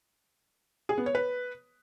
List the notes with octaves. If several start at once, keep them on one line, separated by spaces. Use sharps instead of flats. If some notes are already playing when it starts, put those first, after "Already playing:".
G#4
B3
C#5
B4